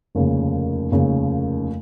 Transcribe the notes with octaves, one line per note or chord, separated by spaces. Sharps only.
F1 D#2 C#3
F1 D#2 C#3